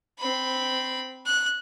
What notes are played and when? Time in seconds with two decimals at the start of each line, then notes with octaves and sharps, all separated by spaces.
0.19 C4 B5
1.26 F#6